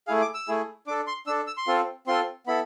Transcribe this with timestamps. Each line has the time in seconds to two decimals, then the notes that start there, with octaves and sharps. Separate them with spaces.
0.07 A3 E4 G#4 F5
0.22 D6
0.34 E6
0.48 A3 E4 G#4
0.87 D4 D6
0.91 A4
1.07 C6
1.27 D4 A4 E6
1.47 E6
1.57 C6
1.67 C4 F4 A4
2.07 C4 F4 A4 C6
2.47 B3 E4 A4 B5